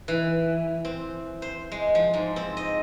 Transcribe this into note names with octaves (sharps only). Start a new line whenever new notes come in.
E3
C4
C5
G#3
F3
G#2
C4
D#5